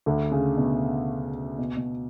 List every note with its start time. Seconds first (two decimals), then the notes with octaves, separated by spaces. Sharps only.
0.06 D2 D3
0.32 C#3
0.57 B2
1.59 B2
1.77 B2